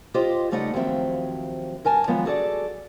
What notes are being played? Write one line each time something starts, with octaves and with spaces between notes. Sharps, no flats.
F4 G4 C5 D#5
C#3 G3 A3 D#4 D#5 F#5
D#2 F3 F#3 C4 E5
G2 A#4 G#5 A5
D#3 F3 F#3 G#3 B3
F#4 G#4 A4 D5